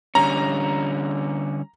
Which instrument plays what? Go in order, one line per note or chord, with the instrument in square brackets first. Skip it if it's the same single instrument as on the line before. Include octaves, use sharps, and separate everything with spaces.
[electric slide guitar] D3 G3 C#4 [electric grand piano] A#5